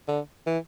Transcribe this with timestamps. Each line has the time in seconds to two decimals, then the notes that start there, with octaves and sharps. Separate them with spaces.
0.08 D3
0.47 E3